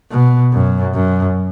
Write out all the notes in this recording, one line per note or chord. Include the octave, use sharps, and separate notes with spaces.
B2
F#2
F#2